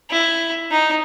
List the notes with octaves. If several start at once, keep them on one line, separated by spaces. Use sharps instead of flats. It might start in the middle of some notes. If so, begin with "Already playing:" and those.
E4
D#4